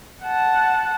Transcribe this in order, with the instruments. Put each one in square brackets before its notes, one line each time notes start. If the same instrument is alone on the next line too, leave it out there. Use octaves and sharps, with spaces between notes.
[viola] F#5 A5